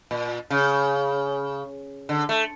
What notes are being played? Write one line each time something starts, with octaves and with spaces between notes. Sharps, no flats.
A#2
C#3
D3
A3